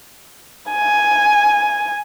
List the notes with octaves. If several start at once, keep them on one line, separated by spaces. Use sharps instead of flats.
G#5